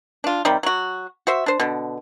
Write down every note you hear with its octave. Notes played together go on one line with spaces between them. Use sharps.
D4 F4
C3 D#3 G3
F#3 F#4
F#4 C5 E5
D4 C5
B2 D3